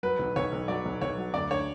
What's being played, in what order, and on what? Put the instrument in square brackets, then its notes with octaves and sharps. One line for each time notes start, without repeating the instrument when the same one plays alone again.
[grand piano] F#3 [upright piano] B4
[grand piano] B1
[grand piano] B1 [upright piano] C#5
[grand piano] B1
[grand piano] F#3 [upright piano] D5
[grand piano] B1
[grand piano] B1 [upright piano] C#5
[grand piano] F#3
[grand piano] D2 [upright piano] D5
[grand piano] D4 [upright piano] C#5